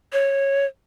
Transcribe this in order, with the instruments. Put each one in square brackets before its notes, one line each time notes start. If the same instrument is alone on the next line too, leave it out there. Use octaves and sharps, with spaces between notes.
[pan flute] C#5